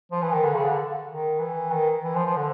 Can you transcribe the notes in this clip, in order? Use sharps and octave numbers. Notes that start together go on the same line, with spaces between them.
F3
E3
D#3
D3
C#3
D3
D#3
E3
D#3
E3
F3
F3
D3